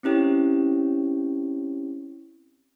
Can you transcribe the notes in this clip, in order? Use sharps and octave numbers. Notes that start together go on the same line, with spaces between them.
C4 C#4 E4 G4 C#5